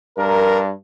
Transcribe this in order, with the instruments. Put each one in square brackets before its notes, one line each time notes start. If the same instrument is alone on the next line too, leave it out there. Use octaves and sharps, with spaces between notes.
[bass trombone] G2 [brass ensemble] A#4